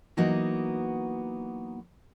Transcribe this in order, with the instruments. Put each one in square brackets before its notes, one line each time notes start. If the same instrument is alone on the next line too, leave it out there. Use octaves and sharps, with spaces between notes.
[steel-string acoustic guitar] E3 F#3 A#3 B3 D#4 F#4